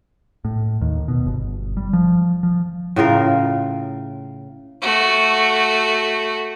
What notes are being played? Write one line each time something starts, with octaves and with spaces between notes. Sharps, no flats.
A2
D#2
B2
G1
G3
F3
F3
A2 C#3 F4 A#4
A3 F#4